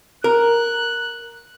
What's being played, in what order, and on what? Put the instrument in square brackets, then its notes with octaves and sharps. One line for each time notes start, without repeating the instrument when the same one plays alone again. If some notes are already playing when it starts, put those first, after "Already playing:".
[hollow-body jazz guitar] A#4 [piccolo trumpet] F#6